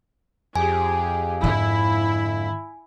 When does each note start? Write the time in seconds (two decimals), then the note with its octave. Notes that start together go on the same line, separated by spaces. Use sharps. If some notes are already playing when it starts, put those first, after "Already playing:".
0.56 F2 G4 G#4 G#5
1.43 G#2 D3 E4